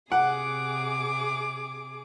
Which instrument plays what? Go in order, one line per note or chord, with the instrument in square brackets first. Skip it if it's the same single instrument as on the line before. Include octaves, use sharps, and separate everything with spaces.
[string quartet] C3 G#4 D6 [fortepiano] F#5